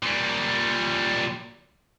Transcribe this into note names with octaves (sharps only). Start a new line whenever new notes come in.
A#2 G3